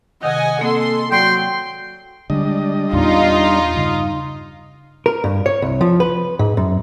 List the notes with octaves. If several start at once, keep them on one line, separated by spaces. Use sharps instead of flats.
C3 D#3 D#5 F#5 G#5
A#3 C4 A4 C6
F#3 D5 G5 C6
D3 G3 G#3 D4 D#5
E2 A#2 B3 D#4 F4
G2 C#3
A#4
G2
C#5
C2
F3
B4
G#2
F#2